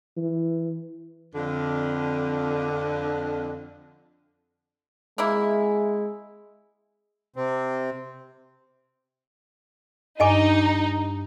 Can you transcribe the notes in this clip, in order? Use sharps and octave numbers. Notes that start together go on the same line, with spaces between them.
E3
F2 D3
C3 G#3 A#3 E4
C3 C4
G2 D#4 D#5 G#5 D6